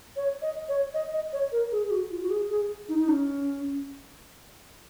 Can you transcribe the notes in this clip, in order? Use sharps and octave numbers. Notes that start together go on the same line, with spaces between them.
C#5
D#5
C#5
D#5
D#5
C#5
A#4
G#4
G#4
F#4
F4
F#4
G#4
G#4
D#4
D#4
C#4